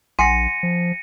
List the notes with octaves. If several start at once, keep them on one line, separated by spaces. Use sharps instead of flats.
A#1 F#5 G#5 C6 A#6 C#7 D#7
F3